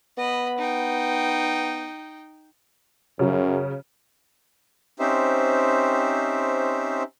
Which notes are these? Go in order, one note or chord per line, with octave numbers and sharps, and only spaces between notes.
B3 D#5 B5
D#4 G5
F#2 C#3 F#3
C4 C#4 D#4 G4 C5 E5